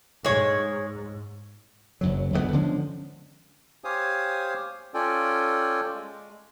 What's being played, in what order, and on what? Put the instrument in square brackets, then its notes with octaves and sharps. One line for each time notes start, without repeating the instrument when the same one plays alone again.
[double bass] G#2 [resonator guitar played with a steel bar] G#3 C#5
[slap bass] F#1 F#2 F#3
G1 C#2 C3 B3
D3 F3 G#3 C#4
[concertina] G4 C5 C#5 F5 G#5 D#6
C#4 F4 A4 D5 G5 G#5
G#3